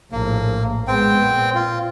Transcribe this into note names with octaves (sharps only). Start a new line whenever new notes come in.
A#1 A2 A#3
G#3 B3 C4 G5
A#2
F4